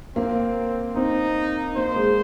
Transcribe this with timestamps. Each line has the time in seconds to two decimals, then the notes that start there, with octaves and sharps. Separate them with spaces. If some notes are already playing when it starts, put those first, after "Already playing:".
0.16 A#3 C4
0.96 C4 D#4
1.76 A#3 C5
1.96 G#3